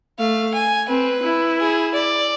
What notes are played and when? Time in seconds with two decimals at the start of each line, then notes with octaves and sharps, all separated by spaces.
0.19 A3 F5
0.54 G#5
0.88 C4 B4
1.23 E4
1.58 G#4
1.94 D5